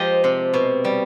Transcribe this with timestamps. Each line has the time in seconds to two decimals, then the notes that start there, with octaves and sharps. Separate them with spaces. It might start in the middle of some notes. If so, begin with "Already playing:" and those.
Already playing: F3 G#3 G4 D#5
0.24 C3
0.54 B2
0.85 G3